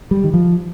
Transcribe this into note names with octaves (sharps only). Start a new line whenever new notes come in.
G3
D#3
F3